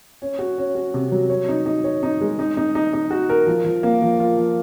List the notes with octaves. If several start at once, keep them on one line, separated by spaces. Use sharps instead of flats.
C#4
F#4
C#4
F#4
C3
F#3
C#5
D#4
D#4
C#5
D#4
G#3
D#4
D#4
D#4
D#4
F#4
A#4
F3
F3
A#3
F3
F4
F3